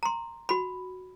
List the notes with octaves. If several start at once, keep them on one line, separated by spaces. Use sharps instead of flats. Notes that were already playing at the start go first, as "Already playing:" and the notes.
A#5 C6
F#4 B5